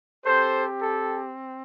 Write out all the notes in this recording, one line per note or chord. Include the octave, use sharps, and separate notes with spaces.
C4 G4 A4 C5
A4